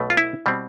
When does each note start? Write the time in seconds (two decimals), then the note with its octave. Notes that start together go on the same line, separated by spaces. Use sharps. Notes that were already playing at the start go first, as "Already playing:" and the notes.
Already playing: B1 B2 A3
0.10 F4
0.17 E4
0.46 B2 G3 C4